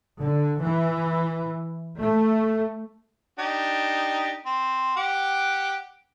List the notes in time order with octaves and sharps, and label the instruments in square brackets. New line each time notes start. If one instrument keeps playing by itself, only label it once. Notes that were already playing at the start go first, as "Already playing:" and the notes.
[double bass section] D3
E3
A3
[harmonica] D4 D#4 G4
C4
G4 F#5 D6